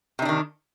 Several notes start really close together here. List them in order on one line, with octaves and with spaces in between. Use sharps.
C3 D#4 D4 D#3